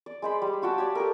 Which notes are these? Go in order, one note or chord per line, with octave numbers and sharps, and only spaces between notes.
D5
G#3 C5 B5 D6
G3
F4 F#4 G5 A5
G4 C#5 D5
G4 A4 A#4